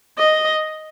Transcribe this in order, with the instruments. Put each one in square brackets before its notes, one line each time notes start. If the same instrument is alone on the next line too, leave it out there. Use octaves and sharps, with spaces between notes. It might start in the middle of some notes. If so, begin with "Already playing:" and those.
[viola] D#5